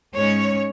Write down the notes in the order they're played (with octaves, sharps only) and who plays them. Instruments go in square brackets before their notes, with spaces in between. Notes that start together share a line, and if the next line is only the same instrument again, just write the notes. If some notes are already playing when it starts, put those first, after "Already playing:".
[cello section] G#2 G#3 C#4 C#5